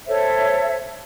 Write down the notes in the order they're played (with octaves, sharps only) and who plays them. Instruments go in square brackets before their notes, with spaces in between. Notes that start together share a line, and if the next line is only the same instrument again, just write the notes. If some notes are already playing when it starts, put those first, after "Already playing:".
[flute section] A4 C5 C#5 E5